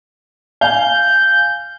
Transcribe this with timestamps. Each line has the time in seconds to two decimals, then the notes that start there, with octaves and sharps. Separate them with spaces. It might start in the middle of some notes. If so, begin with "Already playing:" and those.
0.61 F5 G#5 G6